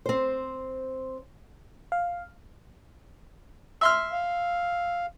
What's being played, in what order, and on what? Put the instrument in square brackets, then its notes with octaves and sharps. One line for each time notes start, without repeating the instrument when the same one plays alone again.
[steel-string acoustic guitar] C4 C5
[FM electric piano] F5
[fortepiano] E5 C6 F6
[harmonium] F5